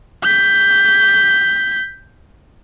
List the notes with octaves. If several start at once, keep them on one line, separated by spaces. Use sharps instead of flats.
G6 B6